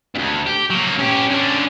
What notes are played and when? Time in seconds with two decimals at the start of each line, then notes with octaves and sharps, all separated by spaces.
0.15 D2 G2
0.46 G4
0.70 F#3 A#3
0.99 C#4 G4
1.30 D3 C#4